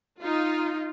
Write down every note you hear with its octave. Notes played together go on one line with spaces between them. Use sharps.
D#4 F4